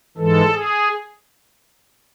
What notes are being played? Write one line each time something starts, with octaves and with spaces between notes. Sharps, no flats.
G#2 E3 G#3 A4
G#4